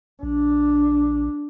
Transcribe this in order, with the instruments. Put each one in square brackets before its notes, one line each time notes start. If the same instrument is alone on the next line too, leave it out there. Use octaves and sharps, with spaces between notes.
[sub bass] A#1 [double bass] D4